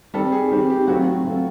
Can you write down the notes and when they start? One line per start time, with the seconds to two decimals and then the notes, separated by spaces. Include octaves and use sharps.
0.14 D#3 G3 C4 A4
0.32 G#4
0.50 D#3 G3 C4 G4
0.70 G4
0.88 F#3 A3 C4 F4 F#4 A4
1.24 F#3 A3 C4 F4 A4